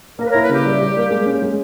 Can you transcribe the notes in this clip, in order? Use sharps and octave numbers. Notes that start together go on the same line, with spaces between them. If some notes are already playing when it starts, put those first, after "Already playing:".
A#3 A#4
B4
A#4 C#5
E4
B4
C#3 G4
G3
G3
A#3
G#3
C#4
G#3